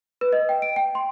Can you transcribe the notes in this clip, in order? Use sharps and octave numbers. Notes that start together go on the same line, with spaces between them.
B4
D#5
G5
D7
G5
C6